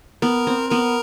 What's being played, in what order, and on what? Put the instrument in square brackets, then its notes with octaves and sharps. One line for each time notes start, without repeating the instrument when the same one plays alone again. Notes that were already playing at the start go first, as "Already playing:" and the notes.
[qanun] B3 [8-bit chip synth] A#4
[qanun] C4
[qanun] B3 [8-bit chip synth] A#4